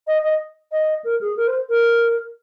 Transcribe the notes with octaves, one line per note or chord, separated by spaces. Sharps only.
D#5
D#5
D#5
A#4
G#4
A#4
C5
A#4